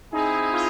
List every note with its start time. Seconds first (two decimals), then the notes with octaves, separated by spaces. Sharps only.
0.13 C4 D#4 E4 G#4
0.27 D#4
0.42 D#4
0.53 F4